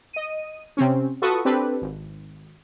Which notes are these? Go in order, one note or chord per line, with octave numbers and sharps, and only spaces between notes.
D#5 D#7
C3 C4 C#4
F4 F#4 A4 B4 C#6 D#6
C4 D4 G4 A4 B4
G#1